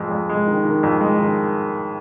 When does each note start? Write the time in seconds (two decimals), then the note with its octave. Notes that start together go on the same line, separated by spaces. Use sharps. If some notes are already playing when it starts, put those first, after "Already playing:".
Already playing: F2 G#3
0.11 F2
0.29 G#3
0.47 D#3
0.65 D#3
0.83 F2
1.01 G#3
1.19 D#3